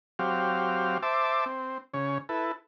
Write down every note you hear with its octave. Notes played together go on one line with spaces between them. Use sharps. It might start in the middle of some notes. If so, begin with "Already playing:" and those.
F#3 C4 G4 F5
C5 E5 A5 D6
C4
C#3 C#5
E4 A4 B4